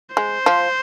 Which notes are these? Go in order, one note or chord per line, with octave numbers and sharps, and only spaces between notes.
G#3 C5
F3